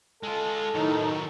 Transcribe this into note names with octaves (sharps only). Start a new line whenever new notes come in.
G#3 F4 A4
A2 D#3 F#3 D#4